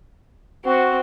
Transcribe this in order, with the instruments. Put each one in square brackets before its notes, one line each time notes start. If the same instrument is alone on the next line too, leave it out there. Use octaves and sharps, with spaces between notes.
[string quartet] C4 [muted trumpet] F#4